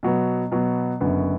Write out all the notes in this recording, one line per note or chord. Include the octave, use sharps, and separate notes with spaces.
B2 F#3 B3
B2 F#3 B3
F#1 F#2 D3 B3 F#4